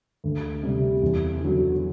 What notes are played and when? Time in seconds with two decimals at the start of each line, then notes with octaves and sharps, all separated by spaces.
0.24 D2
0.63 C3 G3
1.02 E2
1.41 D3 F#3